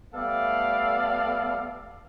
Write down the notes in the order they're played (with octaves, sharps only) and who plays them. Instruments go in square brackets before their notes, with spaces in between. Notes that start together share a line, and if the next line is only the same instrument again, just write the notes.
[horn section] G3 A3 B3 A4 D5 F5